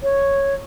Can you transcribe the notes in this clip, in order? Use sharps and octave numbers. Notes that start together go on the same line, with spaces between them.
C#5